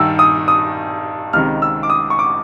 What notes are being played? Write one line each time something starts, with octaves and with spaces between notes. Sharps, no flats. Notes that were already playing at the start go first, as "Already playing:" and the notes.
Already playing: G2 D#3 E6
D#6
D#6
C#2 C3 D#3 F6
E6
D6
D#6
C#6
D6